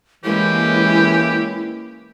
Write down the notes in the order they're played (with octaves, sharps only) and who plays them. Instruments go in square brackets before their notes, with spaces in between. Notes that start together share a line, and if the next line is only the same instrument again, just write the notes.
[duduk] E3 [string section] G#3 A#3 C#4 [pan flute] E4 [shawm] G4